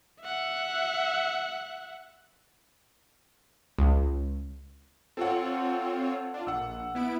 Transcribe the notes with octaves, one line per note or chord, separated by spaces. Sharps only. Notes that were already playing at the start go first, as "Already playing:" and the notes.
E5 F#5
C#2
C4 F4 A4 C#5 F#5
D4 F4
A#1 F#5 E6
B3 E4 D7